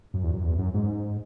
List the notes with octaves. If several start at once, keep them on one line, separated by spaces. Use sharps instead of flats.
F#2
E2
F#2
E2
F#2
G#2